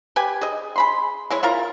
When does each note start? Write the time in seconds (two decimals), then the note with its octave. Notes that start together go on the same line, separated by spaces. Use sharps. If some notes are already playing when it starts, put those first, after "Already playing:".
0.16 G4 B4 G#5
0.41 G#4 D#5
0.76 G#4 B5 C6
1.30 G#3 E4 C#5
1.43 E4 F4 A#4 A#5